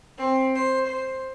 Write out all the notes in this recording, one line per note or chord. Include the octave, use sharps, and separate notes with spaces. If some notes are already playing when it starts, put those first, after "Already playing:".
C4
C5
C5